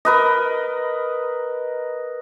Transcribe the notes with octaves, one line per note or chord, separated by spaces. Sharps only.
A#4 B4 D#5